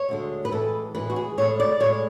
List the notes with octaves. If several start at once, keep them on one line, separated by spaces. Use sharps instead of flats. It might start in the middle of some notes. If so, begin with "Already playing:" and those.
Already playing: C#5
D2 D3 G#3
B4
A2 E3 G#3 A4
A2 E3 G#3 B4
F#4
G#4
A2 G#3 C#5
D5
A2 G#3 C#5